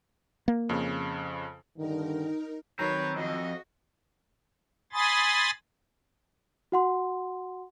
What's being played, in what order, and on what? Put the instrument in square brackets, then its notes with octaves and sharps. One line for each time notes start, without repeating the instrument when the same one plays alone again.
[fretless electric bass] A#3
[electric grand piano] F2 C#3
[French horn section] G2 D3 D#3 [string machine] D#4 A#4
[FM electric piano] D#3 F#3 A#5 [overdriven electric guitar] C4 [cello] B4 [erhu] C#5
[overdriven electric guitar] F2 [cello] F#4 [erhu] D#5
[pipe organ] G#5 B5 C6 D#6 A6
[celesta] F#4 F#5 C6